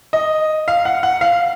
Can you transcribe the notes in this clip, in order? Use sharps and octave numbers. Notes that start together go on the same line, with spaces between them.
D#5
F5
F#5
F#5
F5